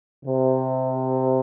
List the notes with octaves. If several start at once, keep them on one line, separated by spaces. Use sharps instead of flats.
C3